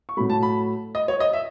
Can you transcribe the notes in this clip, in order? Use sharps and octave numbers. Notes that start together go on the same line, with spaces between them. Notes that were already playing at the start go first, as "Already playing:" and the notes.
C#6
A2 F#3 A3 B5
A5
B5
D#5
C#5
D#5
E5